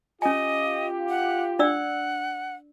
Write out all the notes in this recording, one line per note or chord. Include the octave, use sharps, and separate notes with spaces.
C#4 F4 G4 D#5 G#5
F#5
D4 D5 F#5 E6